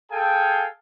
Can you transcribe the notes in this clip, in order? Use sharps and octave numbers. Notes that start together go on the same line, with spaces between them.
G#4 A4 F5 G5 G#5